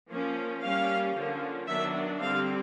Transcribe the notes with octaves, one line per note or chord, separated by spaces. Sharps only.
F3 A#3 C#4
G3 A#3 C#4 F5
D3 F3 A#3 C#4
D#3 F#3 B3 D4 E5
D3 G3 C4 F5